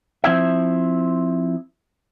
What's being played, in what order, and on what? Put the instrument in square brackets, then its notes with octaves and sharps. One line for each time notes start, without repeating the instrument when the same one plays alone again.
[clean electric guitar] F3 C4 E4 E5